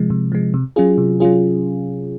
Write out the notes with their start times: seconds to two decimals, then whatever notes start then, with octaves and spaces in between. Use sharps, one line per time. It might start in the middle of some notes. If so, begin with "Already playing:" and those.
Already playing: C3 F3 G#3
0.10 C3
0.32 F3 G#3
0.54 C3
0.76 F#3 C#4 F4 G#4
0.98 C3
1.20 F#3 C#4 F4 G#4